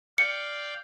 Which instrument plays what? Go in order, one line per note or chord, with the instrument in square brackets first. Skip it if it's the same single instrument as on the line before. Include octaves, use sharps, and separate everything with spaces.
[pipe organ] D5 F5 G5 [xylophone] C#7